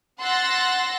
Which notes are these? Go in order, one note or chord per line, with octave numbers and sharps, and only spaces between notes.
F#5 C6 E6 F#6 A6 A#6